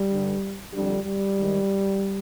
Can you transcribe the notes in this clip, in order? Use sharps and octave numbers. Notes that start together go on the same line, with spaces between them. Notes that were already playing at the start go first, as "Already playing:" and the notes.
Already playing: G3
G2 D3
F2 D3 G3
G3
G#2 D#3